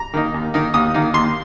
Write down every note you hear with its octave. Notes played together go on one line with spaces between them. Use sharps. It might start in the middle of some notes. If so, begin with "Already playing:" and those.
Already playing: A#5
D#3 A#3 D#4
D#2
D#3 A#3 D#4
D#2 D#6
D#3 A#3 D#4
D#2 C6